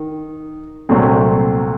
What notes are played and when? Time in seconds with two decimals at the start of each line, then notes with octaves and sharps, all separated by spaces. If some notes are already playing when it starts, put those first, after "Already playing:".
Already playing: D#3
0.89 C2 A#2 F#3 A3 C4